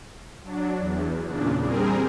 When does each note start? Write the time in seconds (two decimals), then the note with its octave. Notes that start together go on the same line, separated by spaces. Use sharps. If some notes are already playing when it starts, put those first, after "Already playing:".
0.43 F#3 D4
0.79 E2
1.25 E2 A#2 C#3 D4
1.59 G3 C4 G#4 A#4